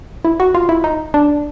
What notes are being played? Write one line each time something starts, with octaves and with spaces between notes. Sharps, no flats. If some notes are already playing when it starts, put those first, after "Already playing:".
E4
F#4
F4
E4
D#4
D4